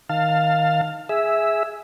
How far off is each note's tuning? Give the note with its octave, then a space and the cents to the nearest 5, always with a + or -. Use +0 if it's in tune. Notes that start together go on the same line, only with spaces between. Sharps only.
D#3 +0 F5 +0 A5 +25
G#4 +0 E5 -5